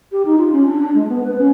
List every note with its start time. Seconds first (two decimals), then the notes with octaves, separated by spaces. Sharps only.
0.12 G4
0.25 D#4
0.38 F4
0.52 C#4
0.66 D4
0.81 D4
0.95 G#3
1.09 B3
1.23 B4
1.39 C#4